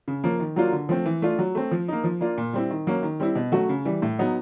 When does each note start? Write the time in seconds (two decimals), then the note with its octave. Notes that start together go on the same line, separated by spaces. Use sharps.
0.08 C#3
0.24 F3 A#3 C#4
0.40 D#3
0.56 F#3 A#3 D4 F4
0.72 D3
0.89 F3 A3 C4
1.06 E3
1.22 A3 D4 F4
1.39 F#3
1.55 A3 C4
1.71 F3
1.88 A#3 D#4
2.04 F3
2.21 A#3 D4 F4
2.38 A#2
2.53 G3 C4 E4
2.70 D#3
2.87 F#3 A#3 C#4
3.03 D#3
3.20 G3 C4 E4
3.35 B2
3.52 F#3 A3 C#4 F#4
3.69 C#3
3.85 E3 G3
4.02 A2
4.19 F#3 B3 D#4